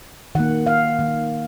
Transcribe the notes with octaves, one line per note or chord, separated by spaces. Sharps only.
D#3 A#3 F#5
F5
D#3 A#3